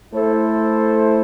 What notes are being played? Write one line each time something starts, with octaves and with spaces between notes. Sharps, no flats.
A3 E4 A4 C5